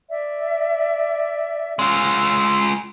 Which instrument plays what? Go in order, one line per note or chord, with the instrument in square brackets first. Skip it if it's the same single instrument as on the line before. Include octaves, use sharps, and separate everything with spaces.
[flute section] D5 E5
[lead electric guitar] G#3 F4 [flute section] C#4 E6